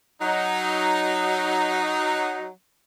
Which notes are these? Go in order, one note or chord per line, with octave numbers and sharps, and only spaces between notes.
F#3 D#4